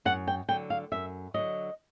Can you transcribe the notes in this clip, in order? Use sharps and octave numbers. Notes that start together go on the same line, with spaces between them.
F#2 F#5
G5
D3 F#3 G5
F5
F#2 E5
D3 F#3 D#5